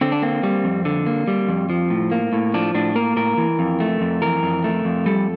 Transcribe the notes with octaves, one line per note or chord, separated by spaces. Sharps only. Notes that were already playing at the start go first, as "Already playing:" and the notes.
D3 C4
D4
A#3 C4
G3
F2
D3
A#3
G3
F2
F3
A2
A#3
A2
F3 D4
A2 D4
A#3 A#4
A2 A#4
E3
F2
A3
F2
E3 A#4
F2
A3
F2
G3 A4